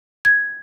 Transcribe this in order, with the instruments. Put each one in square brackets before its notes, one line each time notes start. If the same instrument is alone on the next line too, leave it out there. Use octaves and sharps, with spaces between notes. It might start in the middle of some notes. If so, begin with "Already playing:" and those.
[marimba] G#6